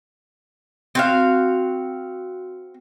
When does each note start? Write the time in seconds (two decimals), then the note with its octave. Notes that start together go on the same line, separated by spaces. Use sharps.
0.95 C4 F#4 F5